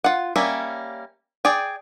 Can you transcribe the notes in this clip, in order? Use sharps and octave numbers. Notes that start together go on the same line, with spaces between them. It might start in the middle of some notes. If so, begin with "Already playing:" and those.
F4 F#5
G3 A#3 C#4 E5
G#4 D5 G5